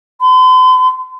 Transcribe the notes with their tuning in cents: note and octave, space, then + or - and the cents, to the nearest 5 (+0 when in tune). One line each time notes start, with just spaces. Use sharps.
C6 -45